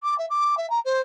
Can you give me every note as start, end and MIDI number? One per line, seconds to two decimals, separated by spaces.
0.03 0.15 86
0.18 0.26 76
0.30 0.55 86
0.57 0.69 76
0.70 0.79 82
0.85 1.01 72